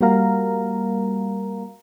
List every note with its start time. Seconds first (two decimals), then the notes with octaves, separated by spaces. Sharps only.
0.01 G3 A#3 F#4 A#4 F5 A#5